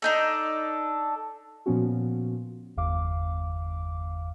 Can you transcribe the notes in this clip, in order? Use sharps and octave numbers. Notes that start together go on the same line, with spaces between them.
D4 D#4 A4
A#2 F3 B3 C#4 F#4
G1 E2 F5 D6